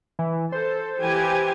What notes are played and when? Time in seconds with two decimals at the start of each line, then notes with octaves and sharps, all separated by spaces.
0.19 E3
0.52 A4 C5
1.01 E3 G4 G#5